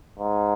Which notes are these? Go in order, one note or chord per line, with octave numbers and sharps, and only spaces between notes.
G#2